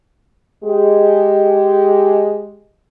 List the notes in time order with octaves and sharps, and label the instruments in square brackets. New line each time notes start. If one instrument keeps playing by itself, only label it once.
[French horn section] G#3 G4